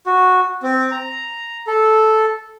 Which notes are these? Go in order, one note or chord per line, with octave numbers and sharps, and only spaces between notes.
F#4
C4
A#5
A4